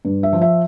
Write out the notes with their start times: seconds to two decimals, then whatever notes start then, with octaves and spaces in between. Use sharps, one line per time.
0.05 G2
0.23 E5
0.33 F3
0.42 E5